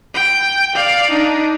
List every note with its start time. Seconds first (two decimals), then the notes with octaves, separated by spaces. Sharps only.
0.14 G5
0.75 D5 F5
1.10 D4 D#4